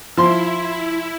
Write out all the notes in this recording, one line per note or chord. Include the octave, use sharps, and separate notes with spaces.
F3 E4 C6